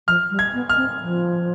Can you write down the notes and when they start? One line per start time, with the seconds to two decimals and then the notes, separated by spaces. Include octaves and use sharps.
0.07 F3 F6
0.30 G3
0.39 G#6
0.54 B3
0.69 F6
0.77 C4
1.01 F3